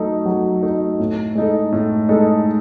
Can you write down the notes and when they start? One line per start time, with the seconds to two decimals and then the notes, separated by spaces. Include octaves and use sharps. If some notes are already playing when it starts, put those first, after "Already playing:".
Already playing: F#3 A3 D#4
0.26 F#3
0.63 A3 D#4
0.99 A2
1.35 G#3 D#4 A4
1.72 A2
2.09 G#3 D#4 A4